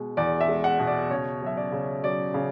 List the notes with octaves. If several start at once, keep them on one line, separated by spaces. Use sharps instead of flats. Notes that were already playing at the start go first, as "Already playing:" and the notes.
Already playing: B2 G#3
E2 D5
E5
G#3
F#5
B2
D5
C#3 C#5
F#3 E5
D5
C#3
F#3 D5
C#3